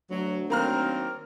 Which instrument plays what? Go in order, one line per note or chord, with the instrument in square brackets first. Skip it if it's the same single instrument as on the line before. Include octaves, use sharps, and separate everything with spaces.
[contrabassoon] D2 [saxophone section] F#3
[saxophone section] D#3 F#3 C4 [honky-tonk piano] A#3 A#5 F6